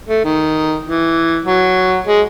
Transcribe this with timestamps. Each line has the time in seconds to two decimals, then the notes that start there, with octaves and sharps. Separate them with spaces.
0.09 A3
0.24 D#3
0.85 E3
1.46 F#3
2.07 G#3